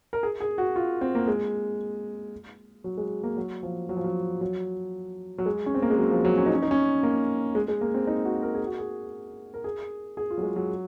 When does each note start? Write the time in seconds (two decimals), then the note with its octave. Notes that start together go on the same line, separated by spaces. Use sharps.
0.13 A#4
0.23 G#4
0.40 G#4
0.58 F#4
0.76 F4
1.01 C4
1.15 A#3
1.27 G#3
2.84 F#3
2.97 G#3
3.23 A#3
3.37 F#3
3.63 F3
3.89 F#3
3.97 F3
4.04 F#3
4.41 F#3
5.38 F#3
5.46 G#3
5.66 C#4
5.75 C4
5.82 A#3
5.90 G#3
5.98 F#3
6.11 F3
6.25 F#3
6.38 C#4
6.46 D#4
6.54 C#4
6.63 D#4
6.71 C#4
7.03 A#3
7.55 G#3
7.68 G#3
7.81 A#3
7.94 C4
8.07 D#4
8.25 F#4
8.42 A#4
8.55 G#4
8.67 F#4
8.78 G#4
9.54 A#4
9.64 G#4
10.17 G#4
10.30 F4
10.37 F#3
10.43 G#3
10.56 F#3